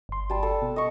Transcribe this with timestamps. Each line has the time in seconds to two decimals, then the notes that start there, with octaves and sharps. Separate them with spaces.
0.09 G1 C6
0.30 G3 A5
0.43 A4
0.62 B2
0.76 D#5 C#6